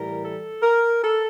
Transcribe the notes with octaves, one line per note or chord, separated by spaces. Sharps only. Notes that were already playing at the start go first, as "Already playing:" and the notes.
Already playing: A2 E3 G3 A#4
A4
A#4
A4